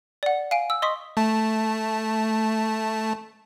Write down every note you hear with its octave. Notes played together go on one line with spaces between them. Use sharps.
D5 F#5
F5 G#5 D7
E6
D#5 C6 C#6 D#6 B6
A3 A5